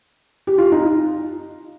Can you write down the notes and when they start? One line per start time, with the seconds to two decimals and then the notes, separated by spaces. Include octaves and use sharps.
0.47 G4
0.58 F4
0.72 D#4